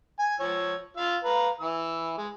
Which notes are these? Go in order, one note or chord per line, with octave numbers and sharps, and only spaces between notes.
G#5
F3 C#5 E6
F4 F5 E6
B4 F5 A#5
E3 E6
G#3